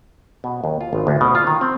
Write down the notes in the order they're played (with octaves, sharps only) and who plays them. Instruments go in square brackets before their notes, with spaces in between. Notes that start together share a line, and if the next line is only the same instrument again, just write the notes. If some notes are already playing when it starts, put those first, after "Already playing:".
[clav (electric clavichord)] B2
D#2
F4
G#1
D2
B2
F4
D#3
C4